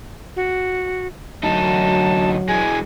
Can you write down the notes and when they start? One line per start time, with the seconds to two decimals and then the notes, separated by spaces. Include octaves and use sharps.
0.36 F#4
1.43 D2 F#3 D#4 A5
2.48 E3 G#3 G#5